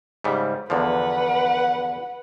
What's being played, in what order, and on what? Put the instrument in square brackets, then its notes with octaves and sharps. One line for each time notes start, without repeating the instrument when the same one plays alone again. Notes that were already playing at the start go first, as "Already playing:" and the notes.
[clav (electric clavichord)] G#2 C#3 G3
[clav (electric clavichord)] E2 D3 F3 [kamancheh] B4 F#5